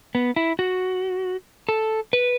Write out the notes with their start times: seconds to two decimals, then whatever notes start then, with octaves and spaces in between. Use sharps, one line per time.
0.15 B3
0.36 E4
0.59 F#4
1.69 A4
2.13 B4